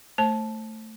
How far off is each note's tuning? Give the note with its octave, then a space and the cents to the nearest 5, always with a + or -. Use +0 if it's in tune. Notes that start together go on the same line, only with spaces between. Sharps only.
A3 +5 C5 +35 A5 -15